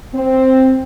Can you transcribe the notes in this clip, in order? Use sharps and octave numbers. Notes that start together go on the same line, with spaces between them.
C4